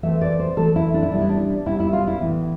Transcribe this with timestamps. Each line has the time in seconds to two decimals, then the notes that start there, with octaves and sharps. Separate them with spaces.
0.03 E3 A3 C4 E5
0.21 D5
0.39 C5
0.57 E3 A3 C4 A4
0.76 E4
0.94 D4
1.03 E4
1.11 C3 G3 B3 D4
1.21 E4
1.29 D4
1.66 C3 G3 B3 E4
1.80 E4
1.93 F4
2.07 E4
2.21 A2 E3 B3